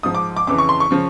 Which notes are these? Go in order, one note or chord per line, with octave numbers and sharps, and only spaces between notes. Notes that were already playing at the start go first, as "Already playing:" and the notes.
G#2 F3 D#6
D6
D6
F2 C#3 E3 D6
C#6
C6
C#6
C#3 F3